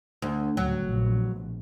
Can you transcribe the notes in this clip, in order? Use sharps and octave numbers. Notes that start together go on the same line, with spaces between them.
D2
D2 A2 C#3 F#3
A#1 B2